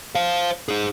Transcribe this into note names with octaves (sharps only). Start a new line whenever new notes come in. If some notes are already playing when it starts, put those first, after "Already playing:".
C5 F5
D#4 G#4